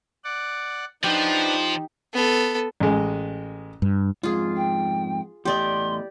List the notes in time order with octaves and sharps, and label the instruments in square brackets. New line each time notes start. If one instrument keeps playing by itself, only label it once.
[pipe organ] D5 F#5
[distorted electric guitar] F3 [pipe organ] D4 B4 F#5 [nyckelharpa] D#4 [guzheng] G4
[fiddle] B3 A4
[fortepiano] A1 G#3
[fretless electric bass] G2
[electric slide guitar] F2 G#2 [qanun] F4 G#4
[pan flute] G5
[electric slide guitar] E2 A2 D#5 [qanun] G4 D5 [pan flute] C6